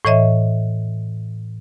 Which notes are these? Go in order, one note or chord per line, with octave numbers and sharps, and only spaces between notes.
A2 E3 C#5 D#5 E5